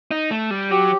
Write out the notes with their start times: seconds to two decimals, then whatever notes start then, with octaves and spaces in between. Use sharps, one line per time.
0.11 D#4
0.31 A3
0.51 G3
0.71 F#3 G4